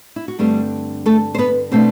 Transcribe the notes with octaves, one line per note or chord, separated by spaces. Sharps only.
E4
F#4
G2 D3 G3 A3 C4 G4
A3 A4
C5
B3 B4
B2 A3 C4 D4 C5